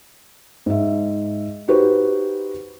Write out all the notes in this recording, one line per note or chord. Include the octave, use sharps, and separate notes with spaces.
G#2 E5
D#4 F#4 G4 B4 C5